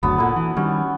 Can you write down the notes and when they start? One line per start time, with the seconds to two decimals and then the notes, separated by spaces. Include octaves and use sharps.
0.03 F#1 D2 F#3 B3
0.18 A#2 D3 E4
0.36 E3
0.57 D#3 G3 C#4